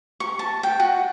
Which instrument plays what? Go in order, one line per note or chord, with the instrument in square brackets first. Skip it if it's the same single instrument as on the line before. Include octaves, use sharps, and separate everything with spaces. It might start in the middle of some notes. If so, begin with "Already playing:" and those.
[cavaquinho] C#6
A5
G5
F#4